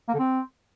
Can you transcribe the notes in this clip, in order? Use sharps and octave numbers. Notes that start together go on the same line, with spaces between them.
A#3
D3
C4